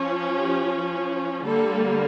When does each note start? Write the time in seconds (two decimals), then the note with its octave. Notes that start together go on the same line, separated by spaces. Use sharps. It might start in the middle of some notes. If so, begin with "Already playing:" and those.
Already playing: F3 C#4
0.36 G4
1.45 D3 G3 A#3 A4